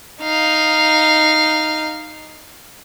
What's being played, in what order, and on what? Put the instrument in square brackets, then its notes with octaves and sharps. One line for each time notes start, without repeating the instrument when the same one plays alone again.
[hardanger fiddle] D#4 F5